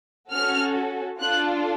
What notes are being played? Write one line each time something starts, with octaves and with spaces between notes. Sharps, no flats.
C#4 F#4 A4 F6
D4 F4 A4 F#6